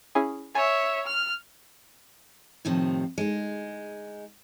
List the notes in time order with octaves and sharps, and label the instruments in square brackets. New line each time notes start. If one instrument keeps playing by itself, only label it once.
[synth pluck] C#4 E4 G#4
[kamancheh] C#5 E5 [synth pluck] G#5
[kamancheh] F6
[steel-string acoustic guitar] A2 C3 D#3 F3
G#3 D#4